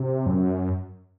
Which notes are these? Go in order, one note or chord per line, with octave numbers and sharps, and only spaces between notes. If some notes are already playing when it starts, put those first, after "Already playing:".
Already playing: C3
F#2